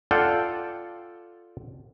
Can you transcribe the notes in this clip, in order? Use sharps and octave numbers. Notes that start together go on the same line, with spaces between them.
F4 A4 D5 F#5 G5